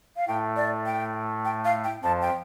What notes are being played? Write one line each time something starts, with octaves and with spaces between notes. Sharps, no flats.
F5
A2 A3 G5
D5
G5
G5
F5
G5
F2 F3 A5
G5